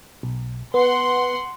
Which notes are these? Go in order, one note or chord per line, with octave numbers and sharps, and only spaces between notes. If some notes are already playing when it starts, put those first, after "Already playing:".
B1
B3 F#5 C6